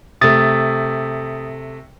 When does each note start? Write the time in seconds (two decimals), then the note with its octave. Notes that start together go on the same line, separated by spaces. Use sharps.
0.21 C3 A3 D#6 A6